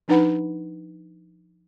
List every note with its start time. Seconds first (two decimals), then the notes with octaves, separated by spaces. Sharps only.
0.08 F3 D4 D#4 B4 F#5 B5